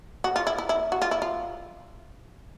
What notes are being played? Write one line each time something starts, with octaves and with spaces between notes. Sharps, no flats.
F#4
F4
E4
E4
E4
F#4
F4
E4
F4